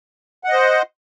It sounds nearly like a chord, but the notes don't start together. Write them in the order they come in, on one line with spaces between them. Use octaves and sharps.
F#5 D#5 C5